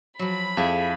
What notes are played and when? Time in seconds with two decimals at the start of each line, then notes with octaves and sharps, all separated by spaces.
0.19 F3 F#3 B5
0.57 F2 E4 G#4 A4 F5